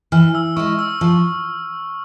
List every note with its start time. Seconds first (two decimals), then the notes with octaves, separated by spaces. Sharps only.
0.12 E3 F6
0.35 E6
0.56 G#3 E4 C#6
0.79 E6
1.01 F3